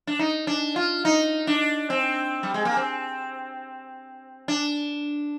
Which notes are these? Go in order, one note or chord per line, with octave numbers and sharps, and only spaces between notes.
D4
D#4
D4
F4
D#4
D4
C4
G3
G#3
A#3
C4
D4